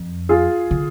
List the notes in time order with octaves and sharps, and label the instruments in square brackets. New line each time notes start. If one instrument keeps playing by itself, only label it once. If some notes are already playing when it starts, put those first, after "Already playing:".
Already playing: [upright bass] F2
[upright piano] F4 G#4
[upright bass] D3